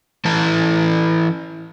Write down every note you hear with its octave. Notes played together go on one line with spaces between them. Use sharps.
E3 E4 A4 A5 A#5